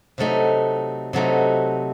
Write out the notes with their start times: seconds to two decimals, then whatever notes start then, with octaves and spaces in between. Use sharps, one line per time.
0.18 C3 F#3 A3 D#4
1.13 C3 F#3 A3 D#4